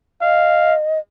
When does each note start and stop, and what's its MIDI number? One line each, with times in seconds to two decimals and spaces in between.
0.22 0.99 75
0.22 0.75 77